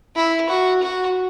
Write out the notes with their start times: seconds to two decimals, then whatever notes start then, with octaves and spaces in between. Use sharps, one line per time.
0.16 E4
0.49 F#4
0.82 F#4